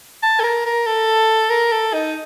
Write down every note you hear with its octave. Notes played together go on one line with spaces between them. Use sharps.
A5
A4
A#4
A#4
A4
A#4
A4
D#4